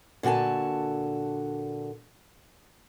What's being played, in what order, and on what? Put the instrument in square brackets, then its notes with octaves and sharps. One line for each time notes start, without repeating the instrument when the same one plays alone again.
[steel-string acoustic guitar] A#2 D3 F#4 G#5 A5